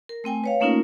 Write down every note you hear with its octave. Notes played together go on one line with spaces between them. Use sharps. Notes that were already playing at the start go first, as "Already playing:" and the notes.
A#4
A3 C4 G5 G#5
B4 C#5 F5
A3 A#3 C#4 D#4 F4 A#4